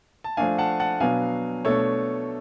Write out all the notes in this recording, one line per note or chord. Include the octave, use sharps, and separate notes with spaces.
A5
F3 A3 D4 F5 G#5
F#5 A5
F#5 A5
B2 F#3 B3 D4 F5 G#5
B2 A3 D4 A4 C#5